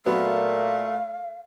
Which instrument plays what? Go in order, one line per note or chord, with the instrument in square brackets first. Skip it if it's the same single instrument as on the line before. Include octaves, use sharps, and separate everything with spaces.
[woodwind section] A#2 [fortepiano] F#3 B3 [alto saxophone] A3 [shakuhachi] F5